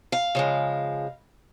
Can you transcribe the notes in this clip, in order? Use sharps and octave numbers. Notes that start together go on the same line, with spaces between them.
F5
C#3 F3 G#3